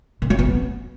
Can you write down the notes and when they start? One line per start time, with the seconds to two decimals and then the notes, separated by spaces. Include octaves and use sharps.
0.22 D#3
0.30 F#3
0.39 B3